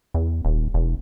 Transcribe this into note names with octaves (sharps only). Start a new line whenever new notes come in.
E2
D#1
E1